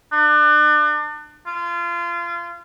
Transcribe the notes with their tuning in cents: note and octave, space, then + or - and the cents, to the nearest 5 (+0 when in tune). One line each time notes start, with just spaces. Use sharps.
D4 +35
F4 -25